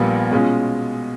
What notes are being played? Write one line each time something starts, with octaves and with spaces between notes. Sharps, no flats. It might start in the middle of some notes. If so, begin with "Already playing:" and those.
Already playing: A#1 A#2 G3 B3
B2 G#3 C#4 F4